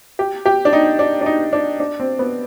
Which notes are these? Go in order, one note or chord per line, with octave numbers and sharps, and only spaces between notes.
G4
G4
D4
D#4
D4
D4
D#4
D4
D4
C4
B3